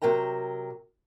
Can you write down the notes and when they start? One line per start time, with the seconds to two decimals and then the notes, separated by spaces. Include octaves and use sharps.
0.02 C3 F#3 A#4 G5 A#5